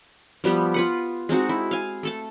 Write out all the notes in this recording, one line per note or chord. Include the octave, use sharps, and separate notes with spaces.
F3 G3 B3 G4
F4 B4 F#5
G#3 C4 D#4 F#4
E4
F5 G#5
A3 A4 A5